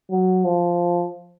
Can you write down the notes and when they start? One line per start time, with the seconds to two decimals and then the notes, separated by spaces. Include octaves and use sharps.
0.11 F#3
0.45 F3